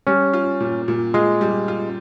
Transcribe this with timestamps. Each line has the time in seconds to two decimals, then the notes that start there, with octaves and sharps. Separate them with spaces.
0.07 G3 C#4
0.33 F4
0.60 A#2
0.88 A#2
1.14 G#3 F4
1.41 G3
1.68 F4